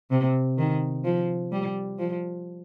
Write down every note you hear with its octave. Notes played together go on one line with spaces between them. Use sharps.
C3
D#3
F3
G3
F3